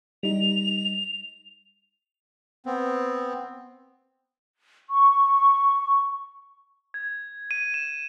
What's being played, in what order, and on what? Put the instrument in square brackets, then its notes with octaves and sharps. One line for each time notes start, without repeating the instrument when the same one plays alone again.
[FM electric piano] G3 D#4 [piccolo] F7
[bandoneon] B3 C4
[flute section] C#6
[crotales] G#6
D#7
E7